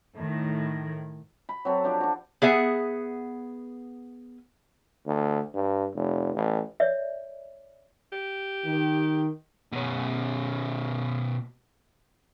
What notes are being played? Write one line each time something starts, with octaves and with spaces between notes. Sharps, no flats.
A2 D#3
B5
F#3 C4 A4
F3 D4 G4
D4 F#4
B3 G#4 E5 F#5
D2
G2
F1
A1
C#5 D5 E5
G4
D#3
B2 C#4